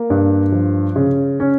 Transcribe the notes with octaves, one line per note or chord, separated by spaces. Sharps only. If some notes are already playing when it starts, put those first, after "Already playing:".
Already playing: A#3
G2
F3
C#3
C#4